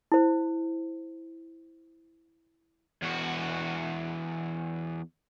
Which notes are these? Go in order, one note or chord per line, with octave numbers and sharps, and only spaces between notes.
E4 C5
E2 F#4